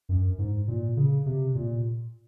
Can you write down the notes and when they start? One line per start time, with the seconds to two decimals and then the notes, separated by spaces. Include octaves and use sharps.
0.09 F#2
0.38 G#2
0.68 A#2
0.97 C#3
1.26 C3
1.55 A#2